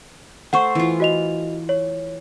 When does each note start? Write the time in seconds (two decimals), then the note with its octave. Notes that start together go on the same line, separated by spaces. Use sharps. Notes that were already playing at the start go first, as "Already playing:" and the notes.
0.53 A3 C5 F#5 C#6
0.75 E3 F4
1.00 F#4 D#5 F7
1.69 C#5